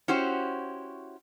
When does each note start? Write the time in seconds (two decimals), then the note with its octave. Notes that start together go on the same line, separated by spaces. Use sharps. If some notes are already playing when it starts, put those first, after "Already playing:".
0.08 C#4 E4 F#4 G4 C5